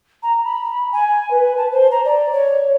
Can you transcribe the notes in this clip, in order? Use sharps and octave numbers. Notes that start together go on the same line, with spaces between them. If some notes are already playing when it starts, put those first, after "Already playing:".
A#5
B5
G#5
B4
A5
C5
A#5
D5
C#5